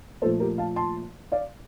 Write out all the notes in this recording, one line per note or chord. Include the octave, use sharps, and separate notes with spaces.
A#2 F3 A3 A4 C5
G4 A#4
F5 A5
A5 C6
D5 F5